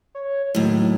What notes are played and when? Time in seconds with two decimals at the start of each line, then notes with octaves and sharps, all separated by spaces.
0.15 C#5
0.55 D#2 A2 F#3